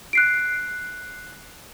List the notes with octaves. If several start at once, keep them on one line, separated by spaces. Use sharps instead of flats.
F#6 C7 D7